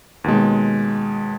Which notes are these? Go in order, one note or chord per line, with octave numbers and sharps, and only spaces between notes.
D#2 B2 G#3